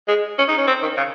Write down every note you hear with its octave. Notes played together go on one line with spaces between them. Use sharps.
G#3
C#4
D#4
C#4
C4
D#3
C#3